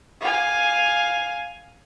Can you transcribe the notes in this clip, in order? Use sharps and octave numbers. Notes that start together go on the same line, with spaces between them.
F5 G#5